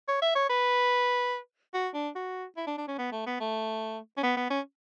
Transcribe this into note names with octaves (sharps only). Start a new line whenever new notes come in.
C#5
E5
C#5
B4
F#4
D4
F#4
E4
D4
D4
C#4
B3
A3
B3
A3
C#4
B3
B3
C#4